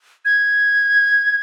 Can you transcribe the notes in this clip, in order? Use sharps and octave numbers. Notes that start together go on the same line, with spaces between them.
G#6